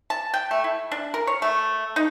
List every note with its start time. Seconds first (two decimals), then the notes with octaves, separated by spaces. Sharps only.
0.10 A5
0.34 G5
0.51 A3
0.64 E4
0.92 D4
1.14 A#4
1.27 C#5
1.42 A3
1.96 D#4